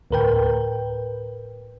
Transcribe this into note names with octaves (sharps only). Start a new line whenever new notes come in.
D2 A2 A#4 B4 G5